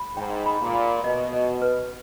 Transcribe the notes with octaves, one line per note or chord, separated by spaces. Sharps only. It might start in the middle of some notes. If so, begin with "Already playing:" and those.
Already playing: B5
G#2 G5
B5
A#2
B5
B2 D#5
D#5
B4